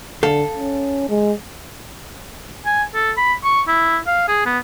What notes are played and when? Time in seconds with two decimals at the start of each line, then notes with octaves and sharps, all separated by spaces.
0.23 D3 A4 F5
0.56 C#4
1.09 G#3
2.65 G#5
2.94 A4
3.17 B5
3.44 C#6
3.68 E4
4.07 F5
4.28 G#4
4.46 B3